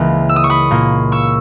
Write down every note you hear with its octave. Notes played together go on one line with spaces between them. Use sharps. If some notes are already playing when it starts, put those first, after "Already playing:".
Already playing: C#2 C#3 E3 A#3 B5
E6
D#6
C#6
B5 D#6
A#2 A#3
C#6 E6